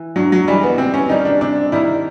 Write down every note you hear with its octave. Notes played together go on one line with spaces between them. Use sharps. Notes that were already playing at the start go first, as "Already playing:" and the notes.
Already playing: E3
G2 F#3
F#3
E3 G3 G#3
B3
C3 C4
C#4
D#3 G3 A#3 D#4
D4
C3 D4
D#3 G3 A#3 E4